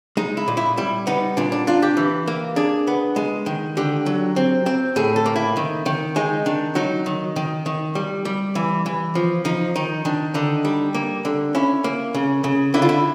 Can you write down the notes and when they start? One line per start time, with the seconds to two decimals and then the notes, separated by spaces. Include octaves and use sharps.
0.17 G#3 D#4
0.37 E4
0.48 A#2
0.57 E4
0.77 G3 E4
1.07 B3 D#4
1.37 A#2 D4
1.52 D4
1.67 D4 F4
1.82 G4
1.97 E3
2.28 A#3
2.56 D4 G#4
2.87 B3
3.16 G#3
3.46 D#3
3.77 D3 G4
4.06 F#3
4.36 C4
4.66 C4
4.96 A2 G#4
5.16 A4
5.26 A#3
5.36 E4
5.57 D#3
5.86 D#3
6.16 G#3 D#4
6.46 D#3 D4
6.75 F#3 D#4
7.06 D#3
7.36 D#3
7.66 D#3
7.95 G3
8.25 G3
8.55 E3
8.86 E3
9.15 F3
9.45 F3 D#4
9.76 D#3 D#4
10.05 D#3 D4
10.34 D3 D#4
10.65 G3
10.95 A#3
11.25 D3
11.55 C#4 E4
11.84 A#3
12.15 C#3
12.44 C#3
12.74 D3 E4
12.82 F4
12.89 E4